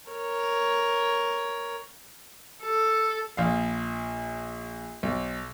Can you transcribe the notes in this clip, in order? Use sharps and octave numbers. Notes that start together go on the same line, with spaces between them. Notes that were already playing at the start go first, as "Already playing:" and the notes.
A#4 C#5
A4
A#1 F5
B1